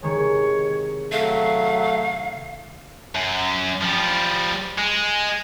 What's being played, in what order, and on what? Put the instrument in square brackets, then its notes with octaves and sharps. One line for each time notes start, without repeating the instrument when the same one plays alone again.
[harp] C3 D#3 G#3 [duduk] C#5
[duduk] F#3 [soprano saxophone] A3 [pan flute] F5
[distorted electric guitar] F#2
F3 G3
G#3